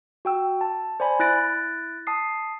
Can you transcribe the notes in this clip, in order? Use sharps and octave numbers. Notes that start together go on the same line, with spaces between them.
F#4 G5 E6
A5
C5 D5 G#5 B5
E4 F#6 A6 A#6 D7
A5 D#6 C7